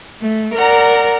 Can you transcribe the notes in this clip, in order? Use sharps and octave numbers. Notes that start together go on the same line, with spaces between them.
A3
A#4 D5 F#5 A#5